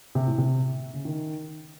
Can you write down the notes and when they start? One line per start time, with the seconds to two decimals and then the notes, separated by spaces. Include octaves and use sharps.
0.15 C3
0.27 A2
0.38 C3
0.94 C#3
1.05 D#3